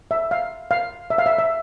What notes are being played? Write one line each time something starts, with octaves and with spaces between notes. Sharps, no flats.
E5
F5
F5
E5
F5
E5
E5